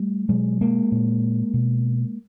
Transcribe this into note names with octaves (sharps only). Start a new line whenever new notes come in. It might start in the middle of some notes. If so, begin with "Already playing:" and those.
Already playing: G3 A3
B2 F#3 G#3
G#3 A#3
A#2
B2